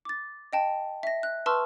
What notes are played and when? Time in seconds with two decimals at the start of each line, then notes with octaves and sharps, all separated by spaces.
0.05 D6 A6
0.53 D#5 G5 A5
1.03 E5 A#6
1.23 F#6
1.46 B4 A5 C6 C#6 E6 F6